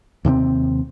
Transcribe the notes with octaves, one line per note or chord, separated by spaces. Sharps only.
D#2 C3 B3 C4